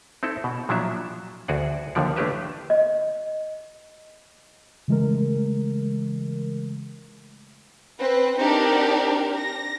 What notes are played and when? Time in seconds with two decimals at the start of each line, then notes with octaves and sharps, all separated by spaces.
0.23 C4 D#4 E4 A4
0.44 B2
0.69 A#2 F3 F#3 D4 E4 E5
1.48 D2 F#4 G#4 D5 F#5
1.95 D#2 D3 F3 D5
2.16 A3 D4 E4 G4 B4 E5
2.70 D#5
4.88 C#3 E3 G#3 A3 A#4
7.98 C4 B4
8.37 C4 D4 D#4 G4 A#4
9.35 A#6